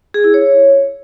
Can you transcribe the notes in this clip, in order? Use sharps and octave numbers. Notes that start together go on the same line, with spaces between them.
G#4
E4
C#5